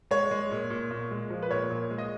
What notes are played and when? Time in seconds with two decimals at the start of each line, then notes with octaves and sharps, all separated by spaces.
0.11 G#3 C#5
0.31 G#3
0.51 A#2
0.70 A#2
0.91 A#2
1.11 G#3
1.30 F3
1.42 B4
1.51 A#2 C#5
1.70 A#2
1.91 G#3
1.98 D#5